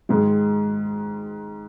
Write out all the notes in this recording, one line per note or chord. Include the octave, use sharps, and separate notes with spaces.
G#2 D#3 G#3